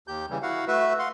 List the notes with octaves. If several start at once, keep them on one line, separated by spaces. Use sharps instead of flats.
D#2 G4 G6
C#3 E3 G3
E4 F#4 F5 F#5
A3 F#4 B4 E5
F5 F#5 C6